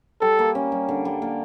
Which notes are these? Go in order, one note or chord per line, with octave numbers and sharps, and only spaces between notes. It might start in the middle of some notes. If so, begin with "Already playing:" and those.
G3 A4
A#3
C#4
G3
D3
G3
A#3